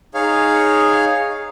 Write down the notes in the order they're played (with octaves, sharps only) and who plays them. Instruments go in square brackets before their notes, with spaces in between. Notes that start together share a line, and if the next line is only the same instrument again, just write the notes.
[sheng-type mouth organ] D#4 G#4 C#5 F5